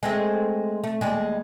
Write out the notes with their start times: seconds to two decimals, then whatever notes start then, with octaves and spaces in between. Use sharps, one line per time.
0.03 G#3 A3 C4
0.84 A3
1.01 D#2 G3 G#3